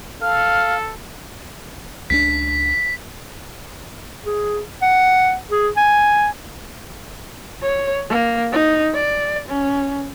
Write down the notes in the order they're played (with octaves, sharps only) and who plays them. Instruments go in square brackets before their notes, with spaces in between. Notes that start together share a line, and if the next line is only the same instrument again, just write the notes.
[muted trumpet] A4 [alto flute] F5 [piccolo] F6
[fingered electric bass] C#2 A3 D4 [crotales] B6
[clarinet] G#4
F#5
G#4
G#5
[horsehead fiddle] C#5
A#3
D#4
D5
C#4